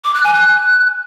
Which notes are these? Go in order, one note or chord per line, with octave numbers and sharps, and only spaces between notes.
D6
F#6
G#5
F#6